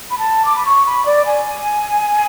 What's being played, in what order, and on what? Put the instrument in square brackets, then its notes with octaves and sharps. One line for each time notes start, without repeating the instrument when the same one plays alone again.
[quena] B5
A5
D6
B5
C#6
B5
D5
G#5